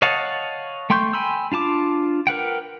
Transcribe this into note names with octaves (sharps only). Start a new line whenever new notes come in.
C#5 D#5 F5 F#5 A5
A3 G5 C6 C#6 G6
G5 G#5 B5 C6 E6
D4 F4 A5 D6
A#4 B4 F#5 G5